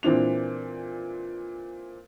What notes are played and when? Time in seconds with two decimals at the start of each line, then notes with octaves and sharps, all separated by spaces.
0.03 A#2 E3 C4 D4 F7